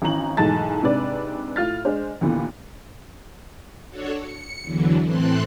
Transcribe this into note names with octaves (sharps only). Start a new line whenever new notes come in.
G#1 E3 C#4 A#5 F#7
B1 E2 G#2 A3 A5 A6
G#2 C3 D4 B4 D5
A2 F4 F6 A6
G#3 D4 C5
D#2 A#2 D3 E3 B3
D4 F#4 A4 C#5
C#7
E2 D3 E3 F#3
A2 E3 C4 A4 C6 F#6